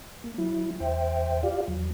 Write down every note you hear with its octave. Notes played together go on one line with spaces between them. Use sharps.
A#3
F#3 E4
E2 C5 E5 G5
F4 G4 D5 F5
E2 F#3